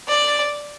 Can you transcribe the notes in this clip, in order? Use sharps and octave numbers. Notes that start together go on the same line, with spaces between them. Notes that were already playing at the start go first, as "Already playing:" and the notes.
D5